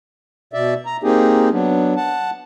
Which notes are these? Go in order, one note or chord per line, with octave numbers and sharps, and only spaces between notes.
B2 D5 E5
A#5
A#3 C4 D#4 G4 G#4
F#3 B3 D4
F#5 A5